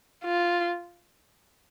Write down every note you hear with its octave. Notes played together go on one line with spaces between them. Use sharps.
F4